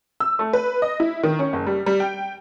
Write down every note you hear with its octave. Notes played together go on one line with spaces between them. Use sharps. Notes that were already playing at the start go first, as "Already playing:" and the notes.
E6
A3
B4
D#5
E4
D#3
C#4
F#1
G3
G3
G5